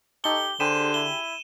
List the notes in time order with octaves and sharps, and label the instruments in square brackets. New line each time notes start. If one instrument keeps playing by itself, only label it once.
[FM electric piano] D#4 A4 C#6 [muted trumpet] G4 [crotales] G7
[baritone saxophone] D3 [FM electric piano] G4 G#4 B5 [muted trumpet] C5 [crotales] D#7 E7
[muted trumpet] E4 [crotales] G7